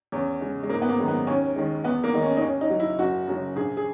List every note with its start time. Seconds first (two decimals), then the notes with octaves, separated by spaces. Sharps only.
0.12 E2 C#4
0.41 C#3 G#3
0.63 G#3
0.70 G#1 A#3
0.82 B3
0.89 A#3
0.98 F#2 D#3 G#3
1.08 B3
1.27 D#2 C#4
1.56 D#3 G#3
1.84 E2 B3
2.04 A#3
2.13 D#3 G#3 D#4
2.23 C#4
2.37 D#4
2.42 D#2 C#4
2.61 D#4
2.70 C#3 F#3
2.80 E4
2.99 F#1 F#4
3.27 F#2 C#3 F#3
3.56 A#1 G#4
3.77 G#4